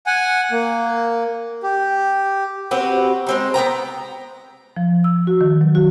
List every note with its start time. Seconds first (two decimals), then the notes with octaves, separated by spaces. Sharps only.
0.06 F#5 G#5
0.51 A#3
1.63 G4
2.71 C4 F#4 G4 B4
3.27 G#3 C4 D#4
3.54 B3 D4 G5 A#5
4.76 F3
5.04 E6
5.27 F#4
5.41 D#3
5.61 F#3
5.75 F#4